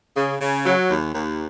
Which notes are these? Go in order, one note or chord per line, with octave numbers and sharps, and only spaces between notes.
C#3
C#3
F#3
D#2
D#2